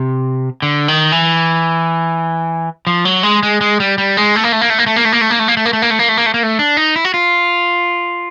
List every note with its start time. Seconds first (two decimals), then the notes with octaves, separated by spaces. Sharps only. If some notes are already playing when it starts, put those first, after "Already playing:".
Already playing: C3
0.62 D3
0.88 D#3
1.12 E3
2.87 F3
3.05 F#3
3.23 G#3
3.43 G#3
3.61 G#3
3.80 G3
3.98 G3
4.17 G#3
4.36 A3
4.44 A#3
4.52 A3
4.61 A#3
4.70 A3
4.79 A#3
4.86 A3
4.96 A#3
5.05 A3
5.12 A#3
5.21 A3
5.30 A#3
5.39 A3
5.48 A#3
5.57 A3
5.65 A#3
5.73 A3
5.82 A#3
5.90 A3
5.99 A#3
6.09 A3
6.17 A#3
6.26 A3
6.34 A#3
6.43 A3
6.59 D4
6.77 D#4
6.96 E4
7.05 F#4
7.14 F4